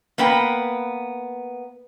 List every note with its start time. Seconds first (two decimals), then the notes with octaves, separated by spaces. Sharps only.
0.18 A#3 B3 B4 G5